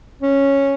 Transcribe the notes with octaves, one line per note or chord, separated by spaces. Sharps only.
C#4